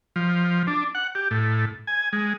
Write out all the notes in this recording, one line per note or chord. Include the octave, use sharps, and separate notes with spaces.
F3
D4
F#5
G4
A2
G#5
G#3